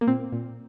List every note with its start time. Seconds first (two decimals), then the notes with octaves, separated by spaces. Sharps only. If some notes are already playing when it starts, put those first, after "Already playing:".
0.01 A#3
0.07 A#2 C4
0.32 A#2